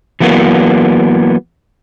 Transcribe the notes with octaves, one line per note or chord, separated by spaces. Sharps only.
E3 F#3 A#3 B3